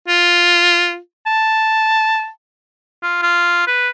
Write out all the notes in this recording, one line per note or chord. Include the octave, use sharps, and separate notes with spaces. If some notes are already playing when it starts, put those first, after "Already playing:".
F4
A5
F4
F4
B4